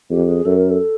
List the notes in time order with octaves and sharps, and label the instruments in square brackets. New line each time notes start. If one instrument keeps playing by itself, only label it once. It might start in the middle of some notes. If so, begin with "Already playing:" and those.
[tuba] F2 [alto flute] G4
[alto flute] G#4
[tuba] F#2 [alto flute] A4
[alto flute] A#4
A4